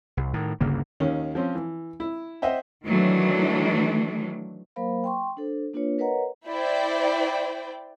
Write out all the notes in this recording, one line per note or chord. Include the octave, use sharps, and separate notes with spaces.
C2
A2 D#3
G1 D2 C#3 A#3
D#2 D#3 C#4
F3 C4 C#4
E3
E4
C5 D#5 E5 F#5 G5
D#3 E3 F#3 A3 D4
F#3 A#3 A#4 C5 F5 B5
G5 C6 C#6
D4 A4 C5
A#3 D4 F4 B4 C#5
A#4 B4 C#5 D#5 F#5 A#5
E4 C5 D5 G5